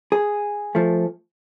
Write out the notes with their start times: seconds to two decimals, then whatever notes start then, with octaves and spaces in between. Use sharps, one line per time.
0.12 G#4
0.75 F3 A3